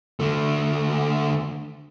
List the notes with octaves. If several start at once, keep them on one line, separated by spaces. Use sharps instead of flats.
D3 A3